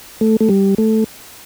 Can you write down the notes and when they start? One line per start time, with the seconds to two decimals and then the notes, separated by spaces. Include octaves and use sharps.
0.21 A3
0.41 A3
0.49 G3
0.78 A3